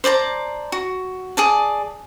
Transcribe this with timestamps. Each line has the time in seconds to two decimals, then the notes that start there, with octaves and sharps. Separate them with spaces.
0.04 C5 D5 A5 A#5
0.72 F#4
1.37 G#4 D5 A5